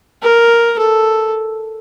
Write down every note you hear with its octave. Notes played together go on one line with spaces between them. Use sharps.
A#4
A4